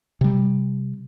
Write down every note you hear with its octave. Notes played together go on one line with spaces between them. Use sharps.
C3 G3